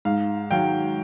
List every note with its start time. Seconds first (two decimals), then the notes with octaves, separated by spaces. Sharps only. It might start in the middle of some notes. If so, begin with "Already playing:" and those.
0.05 G#2 F5
0.51 D#3 F#3 F5 G5